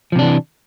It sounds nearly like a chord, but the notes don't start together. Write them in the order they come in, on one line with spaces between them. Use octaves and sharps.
F3 C3 D4 E3